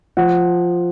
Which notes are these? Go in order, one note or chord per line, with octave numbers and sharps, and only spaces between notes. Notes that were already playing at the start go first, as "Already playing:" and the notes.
F3 F#5